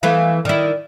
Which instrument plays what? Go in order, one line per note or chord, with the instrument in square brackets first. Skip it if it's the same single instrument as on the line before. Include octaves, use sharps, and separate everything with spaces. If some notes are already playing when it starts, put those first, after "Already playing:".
[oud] E3 A3 B3 [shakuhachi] F5
[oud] D#3 E4 [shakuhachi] D5